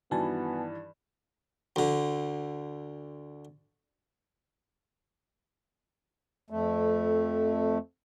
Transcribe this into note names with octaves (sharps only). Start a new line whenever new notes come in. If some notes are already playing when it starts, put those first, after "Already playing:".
G2 D#3 E3 B3 F#4 G#5 A5
D2 D3
F2 A3